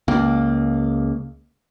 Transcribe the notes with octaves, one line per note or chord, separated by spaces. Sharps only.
C#2 A#3